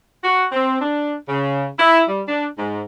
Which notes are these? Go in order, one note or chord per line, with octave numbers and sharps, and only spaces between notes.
F#4
C4
D4
C#3
E4
G3
D4
G#2